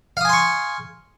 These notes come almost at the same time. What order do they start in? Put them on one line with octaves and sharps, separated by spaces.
F5 D#6 G#5 C6 C#6